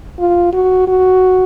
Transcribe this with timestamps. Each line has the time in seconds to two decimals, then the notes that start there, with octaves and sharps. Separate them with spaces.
0.19 F4
0.53 F#4
0.88 F#4